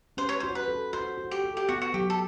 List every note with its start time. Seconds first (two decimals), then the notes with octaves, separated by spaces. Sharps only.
0.17 C#4 C5
0.29 C#5
0.40 F#4 C5
0.55 B4
0.68 A4
0.93 F#4 C5
1.18 F#4
1.31 G4
1.44 A4
1.57 G4
1.69 B3 F#4
1.82 F#4
1.94 F#3 G4
2.10 A4